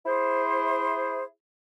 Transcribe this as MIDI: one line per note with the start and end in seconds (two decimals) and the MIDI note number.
0.06 1.23 64
0.06 1.23 68
0.06 1.23 72